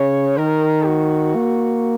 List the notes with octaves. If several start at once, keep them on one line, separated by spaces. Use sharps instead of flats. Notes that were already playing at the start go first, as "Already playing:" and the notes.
Already playing: C#3 C#5
D#3 A#4
F#4
A#3